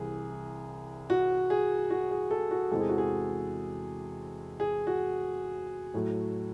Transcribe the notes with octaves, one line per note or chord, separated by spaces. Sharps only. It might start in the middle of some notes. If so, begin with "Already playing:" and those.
Already playing: C2 C3 E3 G#4
F#4
G#4
F#4
G#4
A4
F#4
E2 C3 E3 G#3 A4
G#4
F#4
G#4
G#4
F#4
A2 F#3 A3